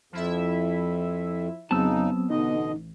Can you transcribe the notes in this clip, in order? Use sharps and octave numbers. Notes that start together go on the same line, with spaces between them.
F2 F3 E4 E5
F2 C#3 F#3 B3 C4 D#4 A5 E6
A1 B2 D3 D#4 D#5